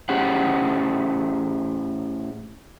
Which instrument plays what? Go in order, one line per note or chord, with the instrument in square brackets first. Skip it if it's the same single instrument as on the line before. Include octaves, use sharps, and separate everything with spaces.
[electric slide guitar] A2 C#4 G4 G#4 C5 F#5